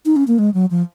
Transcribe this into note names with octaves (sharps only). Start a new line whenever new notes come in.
D#4
C#4
A#3
G#3
F#3
F3